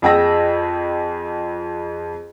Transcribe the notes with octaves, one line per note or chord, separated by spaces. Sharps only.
F2 G#4 G5 E6 A#6